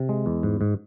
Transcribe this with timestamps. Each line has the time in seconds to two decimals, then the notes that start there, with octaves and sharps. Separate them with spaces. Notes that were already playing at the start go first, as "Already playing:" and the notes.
Already playing: C3
0.09 G#3
0.26 E2
0.43 G#2
0.61 G#2